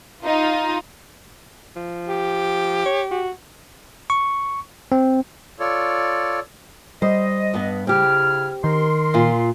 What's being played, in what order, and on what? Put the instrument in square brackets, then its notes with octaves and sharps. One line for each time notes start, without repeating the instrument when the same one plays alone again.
[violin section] D#4 F4
[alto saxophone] F3
[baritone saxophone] G4
[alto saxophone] C#5
F#4
[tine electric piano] C#6
C4
[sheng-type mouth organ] F4 A4 C#5 D5
[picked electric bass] G3 [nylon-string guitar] C5 [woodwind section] D#5
[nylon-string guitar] G2 B3
[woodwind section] C#3 E4 F6 [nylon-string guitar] C4 G4
[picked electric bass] D#3 [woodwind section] A#4 C6
[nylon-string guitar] A#2 F4